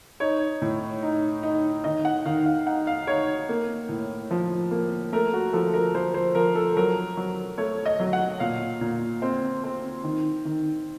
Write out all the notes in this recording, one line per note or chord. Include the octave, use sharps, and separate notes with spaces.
D#4 C#5
A2
D#4
D#4
D#3 D#5
F#5
D#3 F5
F5
D#4 F#5
F5
D#4 C#5
A#3
A2
F3
A#3
A3 A#4
F#4
F3 A4
A#4
F3 C5
C5
F3 A#4
A4
F#3 A#4
F#3
A3 C#5
D#5
F#3
F#5
A#2 F5
A#2
C4
C4
D#3
D#3